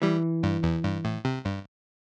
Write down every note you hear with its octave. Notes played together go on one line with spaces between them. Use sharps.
E3 G3
G2
E2
G2
A2
C3
G2